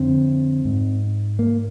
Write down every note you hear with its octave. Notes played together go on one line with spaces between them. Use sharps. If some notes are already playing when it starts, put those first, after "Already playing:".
Already playing: F2 D3 C4
G#2
A#3